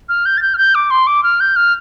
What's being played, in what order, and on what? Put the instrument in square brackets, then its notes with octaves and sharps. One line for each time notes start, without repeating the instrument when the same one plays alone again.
[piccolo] F6
G6
A6
G6
F6
G6
D6
C6
D6
F6
G6
F6